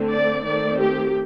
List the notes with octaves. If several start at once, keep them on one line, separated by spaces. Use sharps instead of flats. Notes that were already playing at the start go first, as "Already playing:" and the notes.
Already playing: D3 A3 C4
D5
D#3 A3 C4 D5
G4